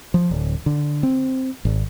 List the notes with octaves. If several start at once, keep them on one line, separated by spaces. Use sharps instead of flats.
F3
D1
D3
C4
G#1